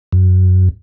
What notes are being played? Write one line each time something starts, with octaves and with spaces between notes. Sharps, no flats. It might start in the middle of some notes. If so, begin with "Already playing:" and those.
F#2